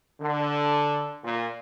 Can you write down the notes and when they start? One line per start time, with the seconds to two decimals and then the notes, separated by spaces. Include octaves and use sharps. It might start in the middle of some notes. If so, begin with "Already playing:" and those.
0.20 D3
1.23 A#2